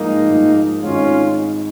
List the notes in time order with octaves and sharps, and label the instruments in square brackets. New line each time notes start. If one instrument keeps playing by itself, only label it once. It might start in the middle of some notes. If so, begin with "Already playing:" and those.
Already playing: [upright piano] G#2 F3 G#3 [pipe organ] A#3 D#4
[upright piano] G#2 F3 G#3
[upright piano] G#1 G#2 G#3 D#4 [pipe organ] C#4 F4